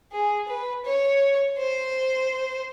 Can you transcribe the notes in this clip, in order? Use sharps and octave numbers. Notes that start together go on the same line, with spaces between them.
G#4
B4
C#5
C5